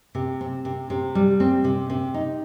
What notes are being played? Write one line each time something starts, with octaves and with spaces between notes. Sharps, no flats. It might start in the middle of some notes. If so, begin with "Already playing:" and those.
C3
C4
C3
C3
G3
C4
C3
C3
D#4